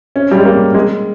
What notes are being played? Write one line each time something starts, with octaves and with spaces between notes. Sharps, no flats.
C#4
G3
G#3
A#3
G#3